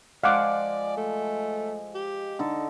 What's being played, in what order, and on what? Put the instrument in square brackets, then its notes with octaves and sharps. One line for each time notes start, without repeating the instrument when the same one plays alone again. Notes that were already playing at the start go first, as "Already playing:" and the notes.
[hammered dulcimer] F3 G#3 [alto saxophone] D5 [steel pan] F5 F#5 D6
[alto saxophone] A3
G4
[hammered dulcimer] D3 D#4 A4